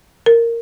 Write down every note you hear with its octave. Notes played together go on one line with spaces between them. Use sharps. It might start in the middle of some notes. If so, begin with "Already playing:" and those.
A#4